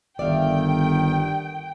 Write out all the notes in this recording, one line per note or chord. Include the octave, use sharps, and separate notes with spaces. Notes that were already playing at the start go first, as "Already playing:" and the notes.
G1 D#3 D5 E5 F5 G5